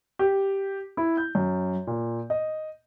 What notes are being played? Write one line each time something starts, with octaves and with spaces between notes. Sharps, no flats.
G4
E4
G6
F#2
A#2
D#5